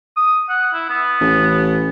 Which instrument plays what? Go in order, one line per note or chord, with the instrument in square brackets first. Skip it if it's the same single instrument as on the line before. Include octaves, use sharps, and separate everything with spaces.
[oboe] D#6
F#5
E4
B3
[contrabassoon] A1